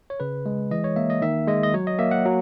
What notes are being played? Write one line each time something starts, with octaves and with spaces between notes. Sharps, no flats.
C#5
C#3 B4
G#3
E3 D#5
C#5
A#3 E5
D#5
D#3 E5
G#3 D#5
D#5
F#3 C#5
D#5
A#3 E5
F#5
F#3